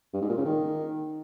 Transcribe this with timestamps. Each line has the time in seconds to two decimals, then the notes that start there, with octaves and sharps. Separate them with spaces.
0.14 G2
0.22 G#2
0.30 A#2
0.37 C#3
0.45 D#3